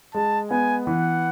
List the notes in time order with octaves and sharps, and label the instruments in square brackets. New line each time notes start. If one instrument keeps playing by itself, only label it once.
[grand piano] G#3 [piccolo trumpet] A5
[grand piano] B3 [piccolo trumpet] G#5
[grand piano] E3 [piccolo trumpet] F#5